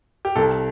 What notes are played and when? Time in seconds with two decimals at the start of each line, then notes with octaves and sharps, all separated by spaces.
0.25 G4
0.36 C2 A4